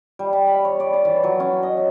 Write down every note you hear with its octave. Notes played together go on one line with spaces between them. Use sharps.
G3
A5
B5
C#5
D5
A5
E3
F#3
C#4
D#5
E5